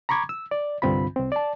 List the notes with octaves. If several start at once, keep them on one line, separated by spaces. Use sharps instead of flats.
A#5 B5 C#6 D6 G#6
E6
D5
C2 G2 D3 C4 F4 B5
C2 C4
D5 A5